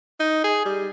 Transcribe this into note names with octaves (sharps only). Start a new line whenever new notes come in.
D#4
G#4
G3